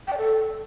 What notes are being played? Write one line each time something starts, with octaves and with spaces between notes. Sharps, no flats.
G5
D5
A4